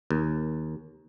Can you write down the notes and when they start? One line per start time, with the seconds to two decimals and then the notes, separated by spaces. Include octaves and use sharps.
0.11 D#2